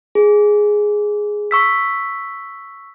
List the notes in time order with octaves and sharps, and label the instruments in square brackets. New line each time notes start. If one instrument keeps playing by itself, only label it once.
[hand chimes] G#4
C#6 E6 B6